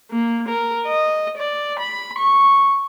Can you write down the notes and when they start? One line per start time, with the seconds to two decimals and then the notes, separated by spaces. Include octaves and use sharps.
0.11 A#3
0.49 A#4
0.87 D#5
1.38 D5
1.80 B5
2.19 C#6